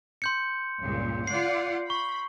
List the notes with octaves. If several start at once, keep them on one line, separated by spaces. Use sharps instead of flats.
C6 G6 C#7
C#2 G2 A#2
F4 D5 F#5 C7
B5 C#6